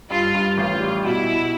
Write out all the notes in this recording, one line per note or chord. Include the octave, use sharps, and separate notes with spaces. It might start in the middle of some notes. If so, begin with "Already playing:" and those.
G2 F4
G2
A1 F4
G3
B2 E4
B2